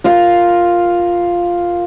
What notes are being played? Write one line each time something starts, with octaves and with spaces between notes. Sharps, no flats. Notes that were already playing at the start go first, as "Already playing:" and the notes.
F4 A#4 F5